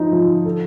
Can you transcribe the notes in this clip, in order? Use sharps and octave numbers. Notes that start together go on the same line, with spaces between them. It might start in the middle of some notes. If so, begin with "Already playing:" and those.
Already playing: F3 D#4
F3
A4